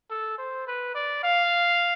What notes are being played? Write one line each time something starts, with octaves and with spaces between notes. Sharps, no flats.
A4
C5
B4
D5
F5